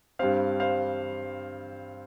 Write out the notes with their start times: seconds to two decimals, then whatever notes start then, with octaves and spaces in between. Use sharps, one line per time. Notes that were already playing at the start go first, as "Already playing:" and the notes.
0.19 G2 G3 C4 C5 F5
0.60 C5 F5